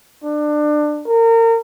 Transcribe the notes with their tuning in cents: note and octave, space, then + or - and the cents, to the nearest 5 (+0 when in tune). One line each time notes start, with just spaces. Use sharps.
D4 +25
A#4 -30